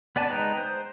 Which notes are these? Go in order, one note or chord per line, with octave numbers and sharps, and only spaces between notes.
B3 D5 G#5 A5
G#3 D#4 B4 G5 A#5
C5